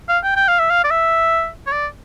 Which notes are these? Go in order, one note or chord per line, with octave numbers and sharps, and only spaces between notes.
F5
G5
G5
F5
E5
F5
D5
E5
C#5
D5